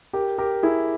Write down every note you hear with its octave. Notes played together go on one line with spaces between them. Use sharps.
G4 A#4
G4 A#4
E4 G#4